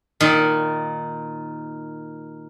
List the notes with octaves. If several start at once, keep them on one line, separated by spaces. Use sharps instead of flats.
A#2 D#3